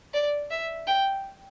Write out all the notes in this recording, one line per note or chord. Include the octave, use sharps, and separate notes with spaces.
D5
E5
G5